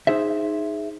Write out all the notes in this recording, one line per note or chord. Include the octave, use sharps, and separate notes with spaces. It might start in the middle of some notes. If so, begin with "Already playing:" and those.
D#4 G#4 C5 E5